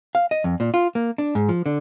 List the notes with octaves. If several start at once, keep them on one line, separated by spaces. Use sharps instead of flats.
F5
D#5
F2
A#2
F4
A#3
D4
G#2
F3
D3